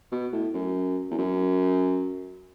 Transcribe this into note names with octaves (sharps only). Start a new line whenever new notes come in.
B2
A2
F#2
E2
F#2